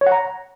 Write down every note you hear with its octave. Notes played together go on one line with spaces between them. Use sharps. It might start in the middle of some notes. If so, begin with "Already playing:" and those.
C#5
F#5
A#5